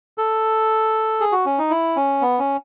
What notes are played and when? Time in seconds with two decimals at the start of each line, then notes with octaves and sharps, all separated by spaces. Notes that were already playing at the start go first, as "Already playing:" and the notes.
0.18 A4
1.21 G#4
1.32 F#4
1.46 C#4
1.59 D#4
1.70 E4
1.96 C#4
2.22 B3
2.39 C#4